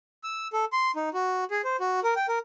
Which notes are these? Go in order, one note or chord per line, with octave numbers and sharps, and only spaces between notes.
E6
A4
C6
D#4
F#4
G#4
C5
F#4
A#4
G5
A#4